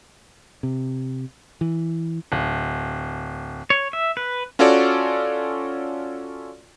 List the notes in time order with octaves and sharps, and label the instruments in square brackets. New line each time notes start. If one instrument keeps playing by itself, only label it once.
[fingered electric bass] C3
E3
[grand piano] D1
[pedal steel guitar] C#5
E5
B4
[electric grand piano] C#4 F4 F#4 A4 C#5 D5